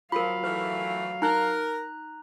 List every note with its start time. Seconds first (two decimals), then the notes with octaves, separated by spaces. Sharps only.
0.12 F3 F#3 F4 A#4 F5 B5
0.44 E3 A3 B4
1.22 D#4 A#4 A#5 F#6